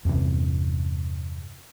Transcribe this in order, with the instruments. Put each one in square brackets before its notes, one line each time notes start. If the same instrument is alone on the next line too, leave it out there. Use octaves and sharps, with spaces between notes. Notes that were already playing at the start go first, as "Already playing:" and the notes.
[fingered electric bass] E2 G2 C3 E3